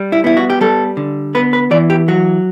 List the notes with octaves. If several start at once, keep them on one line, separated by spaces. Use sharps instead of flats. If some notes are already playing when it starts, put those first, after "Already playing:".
Already playing: G3
E4
B3 E4
F#4
G4
G3 A4
D3
B3 B4
B4
E3 D5
G4
F#3 F#4